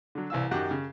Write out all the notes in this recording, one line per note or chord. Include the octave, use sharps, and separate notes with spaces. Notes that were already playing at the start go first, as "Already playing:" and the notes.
D3 F#3
C2 E3 F5 E6
F#2 D#3 F#4 G4 F#5 G5
C#3